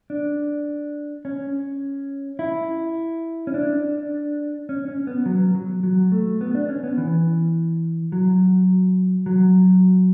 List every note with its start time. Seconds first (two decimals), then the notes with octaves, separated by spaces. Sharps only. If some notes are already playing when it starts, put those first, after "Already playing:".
0.10 D4
1.25 C#4
2.39 E4
3.47 C#4
3.54 D4
4.69 C#4
4.88 C#4
5.07 B3
5.26 F#3
5.55 F#3
5.83 F#3
6.12 A3
6.41 B3
6.55 D4
6.69 C#4
6.83 B3
6.98 E3
8.12 F#3
9.26 F#3